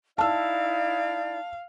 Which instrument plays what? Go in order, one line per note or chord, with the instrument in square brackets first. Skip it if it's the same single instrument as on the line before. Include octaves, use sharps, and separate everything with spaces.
[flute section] D#4 E4 D5 [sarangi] F5 [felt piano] A5 E6